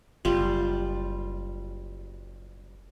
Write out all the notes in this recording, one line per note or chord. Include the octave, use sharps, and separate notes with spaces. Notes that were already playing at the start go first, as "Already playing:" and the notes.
F#1 G3 F4